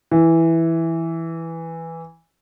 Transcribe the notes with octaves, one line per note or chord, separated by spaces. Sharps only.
E3